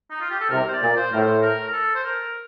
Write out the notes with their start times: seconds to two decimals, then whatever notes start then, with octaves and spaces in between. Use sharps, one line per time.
0.11 D#4
0.21 F4
0.31 G4
0.40 A4
0.50 C2 C3 A#4
0.68 C5
0.73 D5
0.81 A#2
0.96 C5
1.12 A2 A#4
1.19 C5
1.42 A#4
1.68 A#4
1.73 A4
1.95 C5
2.04 A#4